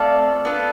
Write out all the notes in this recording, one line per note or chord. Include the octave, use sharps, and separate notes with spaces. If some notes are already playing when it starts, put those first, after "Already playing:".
Already playing: A3 C4 F4 A4 D5 F5
B3 D4 F4 A4